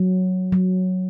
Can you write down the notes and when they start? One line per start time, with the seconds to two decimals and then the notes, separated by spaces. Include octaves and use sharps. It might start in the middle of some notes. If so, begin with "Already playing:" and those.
Already playing: F#3
0.52 F#3